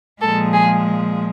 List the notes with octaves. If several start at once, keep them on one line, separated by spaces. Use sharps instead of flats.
A#2 F3 G#3 A4
G#4